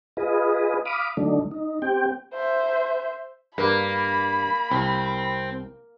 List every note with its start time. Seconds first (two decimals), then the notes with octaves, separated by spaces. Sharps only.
0.17 F4 G#4 B4 D#5
0.85 F5 B5 D6 D#6
1.17 D3 F#3 A3 D4 D#4
1.51 D#4
1.82 C4 G4 G5
2.34 C5 E5
3.58 G2 A#3 B4 B5
4.72 C2 C4